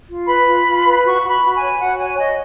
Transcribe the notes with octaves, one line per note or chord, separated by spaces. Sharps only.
F4
B4 B5
F4
F4
B4
F#4 C#6
F#4
B5
F#4
G#5
C#5
F#4 F#5
C#5 G#5
C#5 D#5